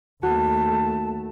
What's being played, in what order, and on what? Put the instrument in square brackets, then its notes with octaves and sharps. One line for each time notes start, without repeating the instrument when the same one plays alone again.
[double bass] D#2 A3 [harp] F#4 [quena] A5